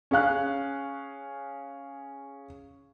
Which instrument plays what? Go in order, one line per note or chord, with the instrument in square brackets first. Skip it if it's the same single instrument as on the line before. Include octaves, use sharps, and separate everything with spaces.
[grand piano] C#4 G#4 F5 F#6